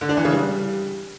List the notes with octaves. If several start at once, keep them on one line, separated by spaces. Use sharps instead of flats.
D3
D4
E3
C#3
G3